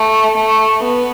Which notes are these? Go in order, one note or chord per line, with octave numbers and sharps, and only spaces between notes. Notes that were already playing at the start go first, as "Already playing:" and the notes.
Already playing: A3
A3
B3